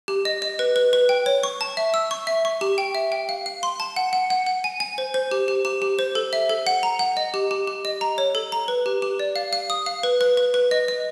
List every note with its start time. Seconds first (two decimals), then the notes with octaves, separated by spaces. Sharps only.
0.08 G4
0.25 D#5
0.42 D#5
0.59 B4
0.76 B4
0.93 B4
1.09 G5
1.26 C#5
1.43 C#6
1.61 A5
1.77 E5
1.94 E6
2.11 C#6
2.27 E5
2.45 C#6
2.61 G4
2.78 G5
2.95 E5
3.12 G5
3.29 F5
3.46 F5
3.63 C6
3.80 A5
3.96 F#5
4.13 F#5
4.30 F#5
4.46 F#5
4.64 G#5
4.80 G#5
4.98 C5
5.14 C5
5.31 G4
5.48 G4
5.65 G4
5.82 G4
5.99 C5
6.15 A4
6.33 E5
6.49 A4
6.67 F#5
6.83 A#5
6.99 F#5
7.17 D#5
7.34 G4
7.51 G4
7.67 G4
7.85 D#5
8.01 A#5
8.18 C#5
8.35 A4
8.52 A#5
8.68 B4
8.86 G4
9.02 G4
9.19 D5
9.36 F5
9.53 F5
9.70 D#6
9.86 F5
10.03 B4
10.21 B4
10.37 B4
10.54 B4
10.71 D#5
10.88 D#5